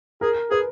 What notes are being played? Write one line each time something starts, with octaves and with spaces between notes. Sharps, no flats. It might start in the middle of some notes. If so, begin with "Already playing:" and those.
G#4 A#4
G#4 B4